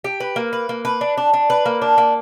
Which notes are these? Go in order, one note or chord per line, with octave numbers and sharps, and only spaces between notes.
G4
B4
A#3
B4
A#3
B4
D4
D4
D4
B4
A#3
D4
A#3